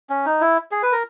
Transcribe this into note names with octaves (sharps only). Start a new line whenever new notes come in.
C#4
D#4
E4
G#4
B4
A#4